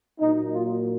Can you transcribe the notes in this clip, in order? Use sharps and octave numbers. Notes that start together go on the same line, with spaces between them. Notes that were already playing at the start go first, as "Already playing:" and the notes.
A#2 F#3 A#3 D#4
F4